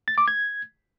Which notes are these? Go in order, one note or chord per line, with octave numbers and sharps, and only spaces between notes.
A6
D6
G#6